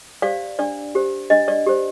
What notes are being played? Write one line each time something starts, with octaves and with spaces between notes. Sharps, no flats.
G4 C5 D5 F5
D4 D5
G4 C5
D4 D#5
D5
G4 C5